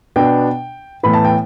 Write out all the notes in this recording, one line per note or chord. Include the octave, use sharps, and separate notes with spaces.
B2 B3 D4 G5
A2 E3 B3 E4 B5
A5
G5